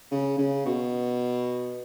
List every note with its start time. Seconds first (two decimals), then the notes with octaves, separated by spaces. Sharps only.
0.11 C#3
0.38 C#3
0.66 B2